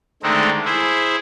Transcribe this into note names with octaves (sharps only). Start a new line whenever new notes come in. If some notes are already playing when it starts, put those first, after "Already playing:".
D3 D#3 G#3 A3 C4 D#4
E4 G#4 C5